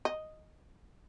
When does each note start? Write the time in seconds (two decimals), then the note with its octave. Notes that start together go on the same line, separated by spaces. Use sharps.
0.05 D#5